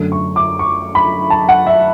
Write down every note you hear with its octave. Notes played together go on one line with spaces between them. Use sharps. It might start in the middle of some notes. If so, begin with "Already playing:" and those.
Already playing: F#2 D3 A3
C#6
D6
C#6
B5
A5
F#5
E5